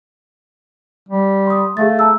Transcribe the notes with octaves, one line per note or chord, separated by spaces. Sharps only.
G3
C6 D#6
A3 G#4 F5 A6
A5 A#5 E6